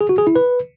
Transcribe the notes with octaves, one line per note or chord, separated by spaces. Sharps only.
G#4
F#4
G#4
E4
B4